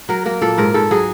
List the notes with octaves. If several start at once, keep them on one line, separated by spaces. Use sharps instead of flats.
F#3 A#4
A#3 A#4
A#2 A4
G#2 A#4
G#2 A4
F#3 G#4